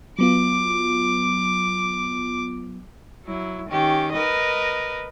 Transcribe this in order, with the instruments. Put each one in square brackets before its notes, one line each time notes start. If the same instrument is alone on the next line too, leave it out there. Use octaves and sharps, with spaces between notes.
[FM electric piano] F#3 B3 F4 [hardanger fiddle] D6
[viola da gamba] F#3 E4
D#3 C#4 G4
A#4 B4 D#5